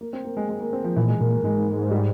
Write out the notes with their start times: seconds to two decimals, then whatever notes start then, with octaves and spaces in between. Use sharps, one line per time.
0.01 A#3
0.13 C4
0.25 A#3
0.37 G#3
0.49 G#3
0.61 A#3
0.73 C4
0.84 F3
0.96 A#2 E3
1.08 G#3
1.20 A#2 A#3
1.32 A#3
1.43 G#2 G#3
1.91 G3